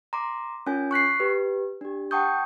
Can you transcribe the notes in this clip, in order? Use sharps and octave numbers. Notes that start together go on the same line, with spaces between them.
A#5 C6 D6
C#4 F4 A#4 G#5 G6
C#6 F#6 B6 C7
G4 B4
D4 G4
F#5 G5 A5 C#6 D#6 G6